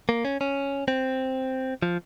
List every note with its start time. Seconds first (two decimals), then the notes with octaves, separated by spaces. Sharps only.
0.09 A#3
0.25 C#4
0.41 C#4
0.88 C4
1.82 F3